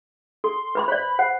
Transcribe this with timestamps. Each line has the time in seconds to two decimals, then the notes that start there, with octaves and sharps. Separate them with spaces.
0.44 A4 C6
0.75 B4 B5 C6
0.88 C5 D5 B5
1.19 C5 F#5